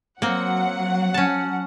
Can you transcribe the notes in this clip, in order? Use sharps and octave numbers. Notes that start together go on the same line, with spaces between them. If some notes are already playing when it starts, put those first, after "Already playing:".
F#3 A#3 C4 F#5
C#4 A5